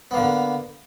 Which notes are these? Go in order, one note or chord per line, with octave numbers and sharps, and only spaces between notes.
D3 A#3 B3